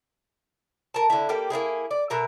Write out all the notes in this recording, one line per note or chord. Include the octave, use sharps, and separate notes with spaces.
A#4 A5
D3 E4
G3 A#3 G4
A#3 C4 E4 G#4
D5
B2 A#4 E5